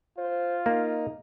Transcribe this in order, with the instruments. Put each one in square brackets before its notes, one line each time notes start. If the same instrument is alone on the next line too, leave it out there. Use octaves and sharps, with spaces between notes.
[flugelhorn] F4 [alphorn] C5
[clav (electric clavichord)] A#3 [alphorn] D#4